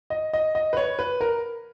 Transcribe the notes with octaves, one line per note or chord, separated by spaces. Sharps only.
D#5
D#5
D#5
B4
C#5
B4
A#4